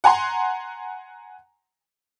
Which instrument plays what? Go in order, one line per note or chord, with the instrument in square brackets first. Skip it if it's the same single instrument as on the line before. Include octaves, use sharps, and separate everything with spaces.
[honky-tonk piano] F#5 G#5 A#5 C6